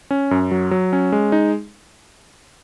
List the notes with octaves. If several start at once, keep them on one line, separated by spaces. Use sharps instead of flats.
C#4
F#2
F#3
F#3
C#4
G#3
D#4